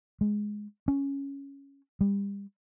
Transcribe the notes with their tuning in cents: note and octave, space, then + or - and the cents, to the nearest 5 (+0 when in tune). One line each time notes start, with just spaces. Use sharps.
G#3 +5
C#4 +0
G3 +30